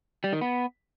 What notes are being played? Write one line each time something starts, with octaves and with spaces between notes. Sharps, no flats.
G3
D#3
B3